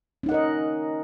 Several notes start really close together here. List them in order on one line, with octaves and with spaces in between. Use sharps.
C#4 D#4 F#5 A#4 D#5